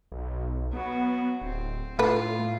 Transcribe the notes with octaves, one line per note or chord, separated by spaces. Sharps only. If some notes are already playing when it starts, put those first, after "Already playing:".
B1
F#3 B3
D1 C4
A2 D3 A3 F4 A4 B4